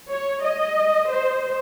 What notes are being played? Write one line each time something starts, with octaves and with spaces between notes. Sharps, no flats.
C#5
D#5
C5